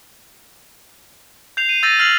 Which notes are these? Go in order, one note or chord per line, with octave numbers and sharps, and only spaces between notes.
G6 C7 F7
D#7
E6 G6 A6 A#6 D#7 F7
F6 A6 C7 F7 F#7